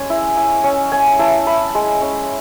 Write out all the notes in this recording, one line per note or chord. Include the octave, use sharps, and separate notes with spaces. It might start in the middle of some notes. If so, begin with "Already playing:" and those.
Already playing: G#3 C#4 G#5
E4
E4
C#4
C#4 G#5
E4 A5
E4 B5
G#3
C#4